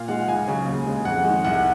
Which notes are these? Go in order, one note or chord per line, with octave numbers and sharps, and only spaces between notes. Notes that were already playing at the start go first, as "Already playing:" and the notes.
Already playing: A#2 F5
G#3 D#4 F#5
C#2 G#5
C#3 F#3
D#2
C#3 G#3
F2 F#5
G#3
D#3
C2 F#5